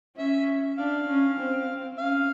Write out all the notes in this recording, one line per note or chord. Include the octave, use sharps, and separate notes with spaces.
C#4 E5
D4 F5
C#4
C4
C#4 F5